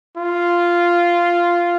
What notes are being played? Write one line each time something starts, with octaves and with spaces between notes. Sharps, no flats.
F4